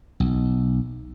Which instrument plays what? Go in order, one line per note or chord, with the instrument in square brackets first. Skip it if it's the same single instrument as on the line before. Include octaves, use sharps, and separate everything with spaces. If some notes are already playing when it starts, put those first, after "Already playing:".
[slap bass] B1